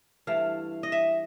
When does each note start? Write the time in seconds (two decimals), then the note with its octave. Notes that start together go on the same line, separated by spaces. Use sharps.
0.27 G2 E3 A3 F5
0.83 D#5
0.92 E5